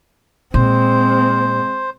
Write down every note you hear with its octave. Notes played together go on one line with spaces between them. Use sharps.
A#2 G#3 C4 C5